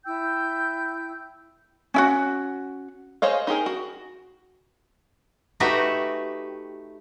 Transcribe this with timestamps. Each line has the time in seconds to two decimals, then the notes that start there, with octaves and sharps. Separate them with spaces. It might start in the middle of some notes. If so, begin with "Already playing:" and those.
0.05 E4 G5 E6 G6
1.94 C#4 E4 F#4
3.22 G#4 C5 C#5 D#5 F5
3.47 D#4 G4 G#4 A#4
3.66 F#4
5.60 A3 D#4 F#4 G4 B4 E5